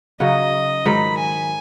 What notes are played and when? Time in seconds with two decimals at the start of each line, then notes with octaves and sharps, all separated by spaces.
0.20 C#3 F#3 D#4 F#4 D#5
0.86 G#2 D#3 F#3 D#4 B5
1.18 G#5